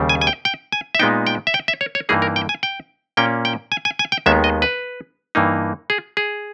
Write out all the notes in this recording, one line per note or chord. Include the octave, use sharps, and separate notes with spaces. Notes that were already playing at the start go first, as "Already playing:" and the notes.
Already playing: D#2 C#3 G3
G#5
G#5
G5
G5
G#5
E5
A#2 G#3 B3 D#4 G5
G5
E5
G5
E5
C#5
C#5
G2 E3 A#3 D#4 G#4
A#4
G5
G#5
G5
A#2 A#3 C#4 G5
G5
G#5
G#5
G#5
G5
D#2 D#3 G#3 B3 E5
D#5
B4
G2 E3 A#3 D#4
G#4
G#4